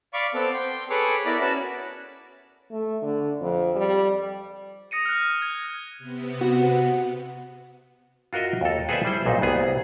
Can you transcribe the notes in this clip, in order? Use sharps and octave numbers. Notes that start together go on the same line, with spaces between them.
D5 F5 B5 C#6 D6
B3 C4 A4 D6
G5 C6
G#4 A4 B4 C#5 D6
B3 E4 A#4 D5 B5
C#4 F#4 B4 A5
A3
D3
F2
G3
D#6 A#6 C#7 D#7
F6 F#6
G#6
C3 B3
F#4
F4 F#4 A#4 D#5 E5
D#2 A4
G#4 A4 B4 C5 D5 E5
G3 E4 C5
B1 A#2 D#4
C2 B3 G#4